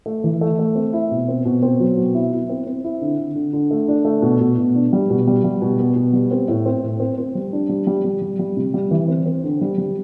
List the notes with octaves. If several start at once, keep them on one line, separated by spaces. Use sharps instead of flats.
A3
E3
A3
A3
C4
E4
B2
C4
B2
C4
F#3
B2
E4
E4
C4
C4
E4
D3
D3
D3
D3
A3
D4
A3
B2
B2
B2
D4
G3
B2
G3
G3
B2
B3
B2
G3
C4
A2
C4
A2
C4
C4
G3
D4
G3
G3
G3
G3
G3
C3
G3
E3
C4
C4
D3
G3
G3